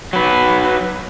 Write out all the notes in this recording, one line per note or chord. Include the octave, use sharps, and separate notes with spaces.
F#3 B4